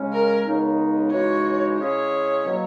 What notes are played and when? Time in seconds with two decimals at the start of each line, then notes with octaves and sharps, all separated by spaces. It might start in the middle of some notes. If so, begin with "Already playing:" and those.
Already playing: C#3 G#3 C#4
0.13 A#4
0.46 C#2 C#3 G#3 B3 D#4
1.11 C#3 E3 G#3 D#4 F#4 C#5
1.78 C#3 G#3 C#4 E4 G#4 C#5
2.45 B2 F#3 A#3